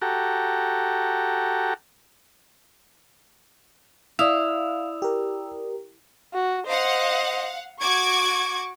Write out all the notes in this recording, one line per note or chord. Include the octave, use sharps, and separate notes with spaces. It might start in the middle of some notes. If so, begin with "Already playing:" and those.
F#4 G4 A4 A#5
E4 D5 F5 D#6 E6 F7
G4 A#4
F#4
C5 D#5 F5 F#5
F#4 C#6 D6 G#6